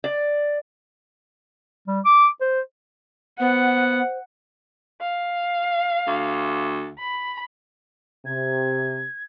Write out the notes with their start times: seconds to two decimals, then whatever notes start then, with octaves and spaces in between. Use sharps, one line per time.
0.04 D5
1.88 G3
2.06 D6
2.41 C5
3.40 B3 C5 F#5
5.01 F5
6.07 D2
7.00 B5
8.26 C3 G#6